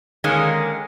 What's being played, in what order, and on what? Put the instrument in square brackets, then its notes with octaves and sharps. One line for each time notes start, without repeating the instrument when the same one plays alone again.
[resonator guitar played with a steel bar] D3 D#3 G#3 A#3 C#4 G#4